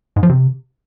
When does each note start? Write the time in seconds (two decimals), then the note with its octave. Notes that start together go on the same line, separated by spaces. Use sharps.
0.16 G#2
0.23 F3
0.29 C3